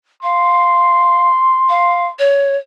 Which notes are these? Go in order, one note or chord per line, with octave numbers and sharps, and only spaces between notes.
F5 C6
F5
C#5